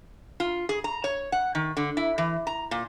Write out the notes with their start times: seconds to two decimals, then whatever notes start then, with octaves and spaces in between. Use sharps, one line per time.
0.40 F4
0.69 G#4
0.84 A#5
1.04 C#5
1.32 F#5
1.55 D#3
1.77 D3
1.97 E4
2.18 E3
2.47 A#5
2.71 A#2